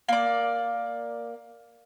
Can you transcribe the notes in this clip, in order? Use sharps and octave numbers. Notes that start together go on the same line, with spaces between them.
A#3 D5